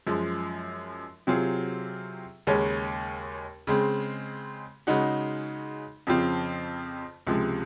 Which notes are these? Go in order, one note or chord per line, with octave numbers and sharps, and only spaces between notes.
F#2 F3 G#3
C3 F#3 C4 F4 G#4
D#2 C#3 G#3 C#4
C#3 G#3 C4
C#3 G#3 D#4 F#4
F2 C#3 F3 C4 F4
C#2 C3 F3 G#3